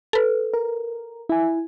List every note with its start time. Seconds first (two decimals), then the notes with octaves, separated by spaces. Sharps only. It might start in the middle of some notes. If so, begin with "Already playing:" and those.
0.13 A4 B4
0.54 A#4
1.29 E4 G#5